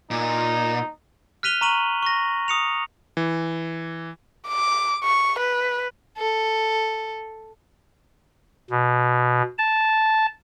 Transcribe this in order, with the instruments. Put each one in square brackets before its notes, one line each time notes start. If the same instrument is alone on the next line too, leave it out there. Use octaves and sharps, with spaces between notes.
[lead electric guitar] A#2 [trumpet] D#4
[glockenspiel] F6 F#6 B6 D#7 F7 G7
A#5 C#6 D#7 F#7
C#6 A#6
D#6 C#7 F7
[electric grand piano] E3
[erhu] D6
C#6
B4
[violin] A4
[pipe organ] B2
A5